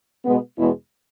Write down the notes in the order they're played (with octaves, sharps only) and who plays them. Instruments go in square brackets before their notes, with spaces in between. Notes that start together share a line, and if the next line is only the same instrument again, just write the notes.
[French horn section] B2 G#3 B3
E2 B2 G#3 B3 E4